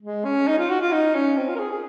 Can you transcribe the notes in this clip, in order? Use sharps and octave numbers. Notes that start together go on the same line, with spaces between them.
G#3
C#4
D#4
F4
F#4
F4
D#4
C#4
C4
F4
A#4
G#4
G#4